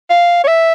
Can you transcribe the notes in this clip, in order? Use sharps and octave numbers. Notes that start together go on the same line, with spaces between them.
F5
C#5
E5